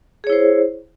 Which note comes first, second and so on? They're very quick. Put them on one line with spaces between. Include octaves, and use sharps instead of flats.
G#4 C#5 E4 C5